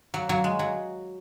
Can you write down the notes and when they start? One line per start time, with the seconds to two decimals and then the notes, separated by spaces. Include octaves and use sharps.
0.14 F#3
0.29 F#3
0.44 G#3
0.59 F#3